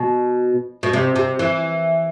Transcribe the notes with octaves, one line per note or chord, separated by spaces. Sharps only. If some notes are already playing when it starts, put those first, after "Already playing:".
Already playing: B2
B2
C3
C3
E3